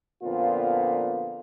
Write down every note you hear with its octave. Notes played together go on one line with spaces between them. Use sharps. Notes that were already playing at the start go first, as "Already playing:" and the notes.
A#2 D3 F3 B3 C4 F4